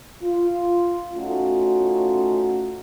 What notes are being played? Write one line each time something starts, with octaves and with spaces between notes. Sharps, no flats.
F4
A3 C#4 D#4 F4 F#4